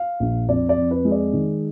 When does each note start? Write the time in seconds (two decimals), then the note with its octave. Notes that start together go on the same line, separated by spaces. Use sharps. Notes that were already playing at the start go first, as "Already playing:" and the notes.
Already playing: F5
0.20 A#1
0.48 F2 D5
0.69 D5
0.77 F2
0.91 B4
1.05 G#3
1.11 D5
1.33 D#3